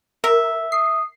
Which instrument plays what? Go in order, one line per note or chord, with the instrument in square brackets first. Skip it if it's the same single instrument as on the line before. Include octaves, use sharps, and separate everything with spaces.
[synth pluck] A#4 [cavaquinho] E5
[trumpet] D#6 [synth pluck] C7